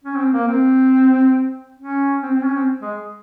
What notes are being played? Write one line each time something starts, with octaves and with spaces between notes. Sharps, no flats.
C#4
C4
A#3
C4
C#4
C4
C4
C#4
C4
G#3